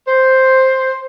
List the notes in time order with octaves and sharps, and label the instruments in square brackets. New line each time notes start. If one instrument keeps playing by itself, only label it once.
[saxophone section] C5